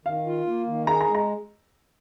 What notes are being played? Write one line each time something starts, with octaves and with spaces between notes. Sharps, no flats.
D#3 F5
F4
A#3
D#3
G#4 A#5
A#5
G#3
A#5